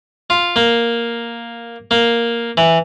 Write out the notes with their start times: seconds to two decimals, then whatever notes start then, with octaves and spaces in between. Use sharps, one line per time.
0.30 F4
0.56 A#3
1.91 A#3
2.57 E3